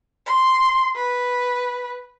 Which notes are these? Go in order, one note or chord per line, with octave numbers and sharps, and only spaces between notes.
C6
B4